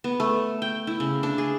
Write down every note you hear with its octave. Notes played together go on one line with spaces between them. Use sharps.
B3
A3
G5
E4
C#3
D4
G#4